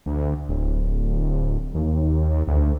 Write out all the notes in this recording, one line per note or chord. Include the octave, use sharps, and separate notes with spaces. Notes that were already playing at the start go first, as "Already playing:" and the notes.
D2
D1
D#2
D2